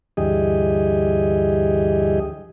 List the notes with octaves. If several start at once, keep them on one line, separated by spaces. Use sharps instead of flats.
D2 G2 E3 G4 G#4 D#5